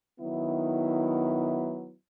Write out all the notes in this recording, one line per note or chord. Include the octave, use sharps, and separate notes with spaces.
D#3 F#3 B3 E4